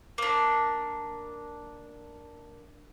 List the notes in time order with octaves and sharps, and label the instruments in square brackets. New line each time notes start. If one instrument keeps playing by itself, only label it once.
[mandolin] A#3 D4